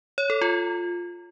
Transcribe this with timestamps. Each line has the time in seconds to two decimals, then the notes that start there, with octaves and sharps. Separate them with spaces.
0.18 C#5
0.30 A4
0.41 F4